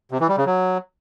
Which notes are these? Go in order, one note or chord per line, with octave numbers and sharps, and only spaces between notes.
C3
E3
G3
C#3
F#3